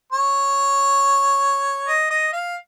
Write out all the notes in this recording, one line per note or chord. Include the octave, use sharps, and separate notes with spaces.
C#5
D#5
D#5
F5